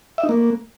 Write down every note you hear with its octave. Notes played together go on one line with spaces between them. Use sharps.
E5
D#4
A#3